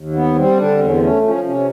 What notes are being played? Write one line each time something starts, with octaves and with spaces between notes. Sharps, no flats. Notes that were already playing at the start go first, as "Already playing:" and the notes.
Already playing: D#2
B3
G3 C4
D3 D4
E2 C4
C#4
C4
A3 C#4
F3 C#4
C3 C#4